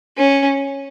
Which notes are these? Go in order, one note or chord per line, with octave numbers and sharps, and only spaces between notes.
C#4